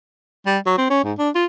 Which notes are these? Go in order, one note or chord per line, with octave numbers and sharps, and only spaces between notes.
G3
F#3
C4
C#4
G#2
D4
F4